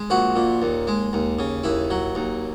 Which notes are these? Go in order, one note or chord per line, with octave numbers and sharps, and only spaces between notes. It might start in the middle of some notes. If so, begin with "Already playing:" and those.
Already playing: G#3
A#1 F#4
A#2
D#2
G#3
D#2
C#3
D#2 E4
F#3
D#2